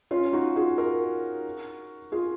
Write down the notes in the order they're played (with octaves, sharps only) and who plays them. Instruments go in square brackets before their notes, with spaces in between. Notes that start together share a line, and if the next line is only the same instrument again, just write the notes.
[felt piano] C#4 F4
D#4 F#4
F4 G#4
F#4 A#4
F4 G#4